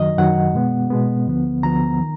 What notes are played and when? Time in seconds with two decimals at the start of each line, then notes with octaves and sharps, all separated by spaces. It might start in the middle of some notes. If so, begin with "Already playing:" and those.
Already playing: F#2 D#3 F#3 D#5
0.18 F#2 D#3 F#3 F#5
0.54 B2 G#3 B3
0.90 B2 G#3 B3
1.27 D2 D3 F3 B3
1.63 D2 D3 F3 B3 A#5
2.01 D#3